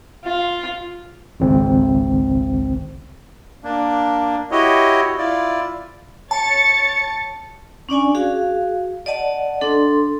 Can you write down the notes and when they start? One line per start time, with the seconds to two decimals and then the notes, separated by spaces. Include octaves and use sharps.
0.24 F4
1.40 G#1 C#2 C4
3.64 A#3 D4
4.51 E4 F#4 G4 C#5 D#5
5.18 E4 F4 D5
6.31 C#5 A5 A6 C#7
7.89 C#4 D4 D5 G#5
8.15 F#4 G#4 F5
9.06 D5 D#5 F#5 A5
9.61 D4 A4 C6